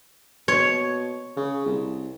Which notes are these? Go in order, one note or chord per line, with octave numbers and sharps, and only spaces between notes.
B2 C#5
C#3
C2